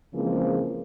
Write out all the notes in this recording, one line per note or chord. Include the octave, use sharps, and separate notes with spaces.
C#3 E3 F3 G#3 A#3 C4